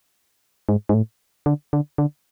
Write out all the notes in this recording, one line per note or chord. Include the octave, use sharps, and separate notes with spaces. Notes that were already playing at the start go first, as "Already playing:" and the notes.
G#2
G#2
A2
D3
D3
D3